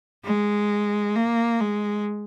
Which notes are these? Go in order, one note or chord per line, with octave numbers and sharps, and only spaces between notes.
G#3
A#3
G#3